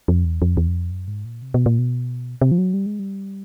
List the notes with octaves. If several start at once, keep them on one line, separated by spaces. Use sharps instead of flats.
F2
E2
F2
E2
F2
F#2
G#2
A#2
C3
B2
A#2
B2
C3
F3
F#3
G3
G#3
G3